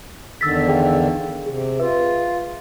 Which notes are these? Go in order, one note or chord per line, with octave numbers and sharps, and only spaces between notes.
E2 D3 D#3 E6 A6 B6
G#4 F5 G5
C3 G#4
F4 G#4 B4 E5